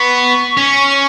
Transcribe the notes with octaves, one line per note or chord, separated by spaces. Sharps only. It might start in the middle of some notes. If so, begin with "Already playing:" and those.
Already playing: B3 C#6
C#4